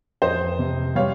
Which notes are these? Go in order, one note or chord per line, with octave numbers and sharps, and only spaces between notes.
F2 C5 D#5
C3
G3 C#5 F5